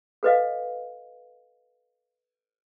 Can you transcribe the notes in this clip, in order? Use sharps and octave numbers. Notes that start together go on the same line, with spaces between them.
A4 B4 D#5 F5